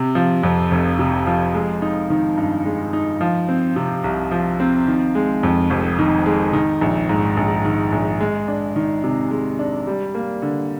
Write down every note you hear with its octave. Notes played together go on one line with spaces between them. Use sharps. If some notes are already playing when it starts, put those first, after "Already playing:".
Already playing: C3
F3
F2
F1
C3
F3
G#3
D#4
D#3
G2
G#3
D#4
F3
C4
C3
C2
F3
C4
D#3
G#3
F2
F1
D#3
G#3
D#3
A#1
G#2
A#1
D#3
A#1
G#3
D4
D#3
C3
G#3
D4
G3
A#3
D3